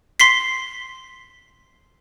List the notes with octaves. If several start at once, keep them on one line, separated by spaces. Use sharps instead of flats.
C6 B6 C7